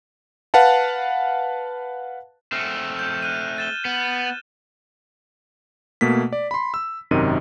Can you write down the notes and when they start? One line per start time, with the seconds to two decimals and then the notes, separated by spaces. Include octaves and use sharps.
0.54 B4 F5 F#5 A5
2.52 A3 C4 F6
2.99 G6
3.22 F6 F#6 D#7
3.58 A6 E7 G7
3.85 B3
6.01 B2 A3 A#3 B6
6.33 D5
6.51 B5 C6
6.74 E6
7.11 G#1 F#2 C3 D#3 D#5 D#7